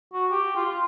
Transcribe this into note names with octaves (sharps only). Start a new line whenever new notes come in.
F#4
G4
F4
F4